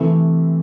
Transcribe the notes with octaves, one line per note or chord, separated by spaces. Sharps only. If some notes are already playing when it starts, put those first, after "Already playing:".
Already playing: C3 E3 A3